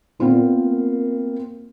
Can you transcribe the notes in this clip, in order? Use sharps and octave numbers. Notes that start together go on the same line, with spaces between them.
A#2 B3 C4 F4
A#3